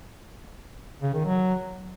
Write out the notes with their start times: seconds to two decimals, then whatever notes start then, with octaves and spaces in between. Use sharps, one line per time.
1.02 C#3
1.14 D#3
1.25 F#3